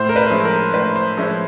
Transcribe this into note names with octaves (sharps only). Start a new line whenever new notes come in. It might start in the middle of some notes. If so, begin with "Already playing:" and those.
Already playing: A2 C5
A#4
B4
F3 G#3 C#4 E4
A#4
A2 B4
C5
F3 G#3 C#4 E4